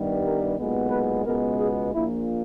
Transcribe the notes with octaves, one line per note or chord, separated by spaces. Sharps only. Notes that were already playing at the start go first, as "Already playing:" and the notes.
Already playing: G2 D#3 G3 B3
A#4
B1 A#2 G#3 B3
B4
C#2 B2 G#3 B3 A#4
G#4
A#1 A#2 A#3 E4